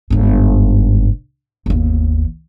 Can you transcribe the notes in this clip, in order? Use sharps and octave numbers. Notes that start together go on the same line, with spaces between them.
G1 G#2
G1 D#2